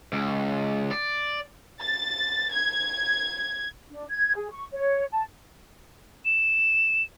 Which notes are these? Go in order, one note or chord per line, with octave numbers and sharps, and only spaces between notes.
C#2
D5
A6
G#6
D4
G#6
G#4
C#6
C#5
A5
E7